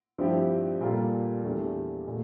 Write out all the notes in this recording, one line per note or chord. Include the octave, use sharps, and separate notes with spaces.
G2 F3 C4 E4 G4
A#2 G3 A#3 F4 A4
E2 E3 A3 D4 G4
A#2 A3